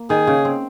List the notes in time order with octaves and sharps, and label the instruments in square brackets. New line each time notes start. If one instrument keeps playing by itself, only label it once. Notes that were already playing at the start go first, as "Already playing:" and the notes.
Already playing: [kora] A#3
[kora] D#3 [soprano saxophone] G#4
[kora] C#3
C4